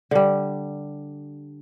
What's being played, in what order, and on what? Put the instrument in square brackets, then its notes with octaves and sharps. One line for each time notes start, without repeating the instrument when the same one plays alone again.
[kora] D3 G3